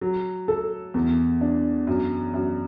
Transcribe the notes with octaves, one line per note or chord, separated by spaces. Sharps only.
F#3
A4
E2
D4
F#2
F#2